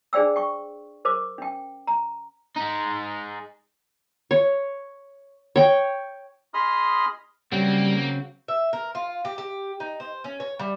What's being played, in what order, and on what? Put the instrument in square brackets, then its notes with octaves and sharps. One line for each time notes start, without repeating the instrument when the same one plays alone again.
[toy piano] D4 G#4 C5 D5 G5 E6
G5 C#6
A#4 C5 D6
C#4 G5
A#5
[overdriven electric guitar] G#3 D#4
[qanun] C#5
C#5 G5
[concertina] G#4 D#5 B5 C6 D#6 F6
[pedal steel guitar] C#3 F#3 C4 [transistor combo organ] G3 [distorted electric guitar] A#3
[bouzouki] E5
A#4
F4
G4
G4
D#4
C5
C#4
C#5
G3